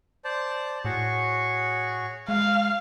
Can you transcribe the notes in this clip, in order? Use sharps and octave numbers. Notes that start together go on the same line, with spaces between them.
C5 D5 A5
A2 F#4 G#4 C#5
G#3 F5